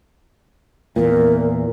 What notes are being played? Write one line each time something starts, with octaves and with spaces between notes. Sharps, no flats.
E2 A#2 A#4